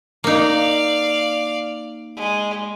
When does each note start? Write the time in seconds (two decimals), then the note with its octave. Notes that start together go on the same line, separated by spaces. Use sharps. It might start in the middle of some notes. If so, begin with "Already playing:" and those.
0.24 A#3 D#4 D5 F5
2.16 G#3